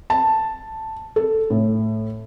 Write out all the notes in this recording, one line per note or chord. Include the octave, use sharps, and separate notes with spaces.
A5
A4
A2